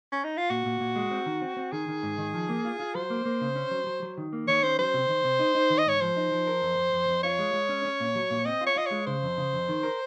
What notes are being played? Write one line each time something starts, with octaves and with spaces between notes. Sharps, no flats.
C#4
D#4
F4
A#2 F#4
A#2
A#2
G#3
C4
D#3
C4
C4
D#3 G#4
D#3
G#2
D#3
F3
A#3
F4
F4
F#3 C5
A#3
A#3
C#3
C#4
F#3
F#3
F#3
D#3
A#3
D#3 C#5
C#4 C5
F#3 C5
C3
D#3
C3
D#4
D#4
D#3
D#5
G#2 C#5
F3 C5
D#4
F3
A#4
F2
F2
F2
F2
F4 C#5
G#3
G#3
C#4
C#4
A#2
F#3
A#2
C4 D#5
F4
C#5
F4 D#5
C#5
G#3
C#3 C5
F2
C#3
F2
D#3
A#4